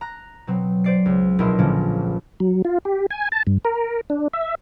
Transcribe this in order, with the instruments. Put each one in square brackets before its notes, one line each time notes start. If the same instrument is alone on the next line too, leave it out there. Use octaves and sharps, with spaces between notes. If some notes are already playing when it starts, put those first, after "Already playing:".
[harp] A#5 F#6
B2 F#3 C4
C5 D5 C7
C#2
A#1 B2 E4 A#4 D#5 C6
C#2 A#2 D3 F3 A#3 C#4
[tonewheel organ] F#3
F4
G4
G#5
A5
G2
A#4
D4
E5